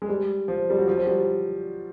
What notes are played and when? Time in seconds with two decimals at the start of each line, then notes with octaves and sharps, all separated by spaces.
0.02 G#3
0.09 G3
0.48 F3
0.70 G3
0.78 F#3
0.87 F3
0.97 F#3
1.07 G3